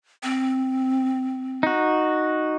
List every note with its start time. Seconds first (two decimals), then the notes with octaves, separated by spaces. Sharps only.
0.23 C4
1.63 D#4 F#4